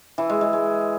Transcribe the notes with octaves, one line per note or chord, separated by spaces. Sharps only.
E3
G#3
G#3
G#3